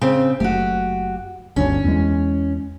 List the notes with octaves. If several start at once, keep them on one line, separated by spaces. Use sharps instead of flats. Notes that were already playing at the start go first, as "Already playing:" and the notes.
C#3 C4
F#1 A3 F#4 G4
G1 D2 D3 C#4
E2 G#3